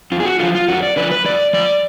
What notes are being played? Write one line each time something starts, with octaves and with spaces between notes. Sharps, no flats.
F2 F4
G#4
F#4
D3 F3 F4
F4
F2 F#4
D5
D3 F3 B4
B4
F2 D5
F3 D5